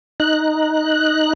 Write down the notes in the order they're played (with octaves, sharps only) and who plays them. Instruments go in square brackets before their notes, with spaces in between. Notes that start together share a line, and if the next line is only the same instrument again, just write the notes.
[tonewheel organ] D#4 F#6